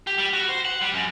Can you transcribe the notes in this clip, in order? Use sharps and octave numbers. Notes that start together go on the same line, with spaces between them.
G4
G3
F#4
C5
F#5
G3
F#2